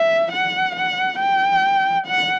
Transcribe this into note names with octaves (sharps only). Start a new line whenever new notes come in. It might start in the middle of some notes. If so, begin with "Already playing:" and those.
Already playing: E5
F#5
F#5
G5
F#5